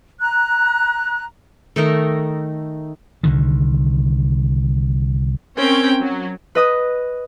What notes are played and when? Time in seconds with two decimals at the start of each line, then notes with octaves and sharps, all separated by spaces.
0.20 A#5 F#6
1.76 D#3 A3 D#4 A#4
3.23 C2 D3 D#3
5.58 C4 C#4 A#4 C#5 G5
6.02 F#3
6.55 B4 D#5 D#6 F#6